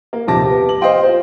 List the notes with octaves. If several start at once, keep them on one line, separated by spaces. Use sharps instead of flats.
A#3
D#1 F2 C3 A5 D6 A#6
B3 G4
F#7
C5 D#5 F5 G5 C6
F4 C5